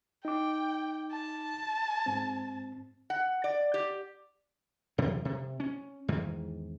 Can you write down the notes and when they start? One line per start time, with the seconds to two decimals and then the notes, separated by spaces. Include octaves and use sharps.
0.25 D#4 G5 D6
1.11 A5
2.06 G#2 C4
3.10 F#5
3.44 D5
3.74 G4
4.98 E2 C3 E3 F#3
5.25 C3
5.60 C#4
6.08 E2 G#2 D#3 E3